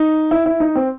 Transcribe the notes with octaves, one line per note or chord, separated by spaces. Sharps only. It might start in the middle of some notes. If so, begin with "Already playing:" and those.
Already playing: D#4
E4
E4
D#4
C4